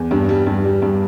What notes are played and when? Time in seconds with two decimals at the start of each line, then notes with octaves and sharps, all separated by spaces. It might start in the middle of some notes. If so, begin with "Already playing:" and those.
Already playing: E2
0.11 G2 D4
0.29 G3
0.47 G2
0.64 G3
0.82 G2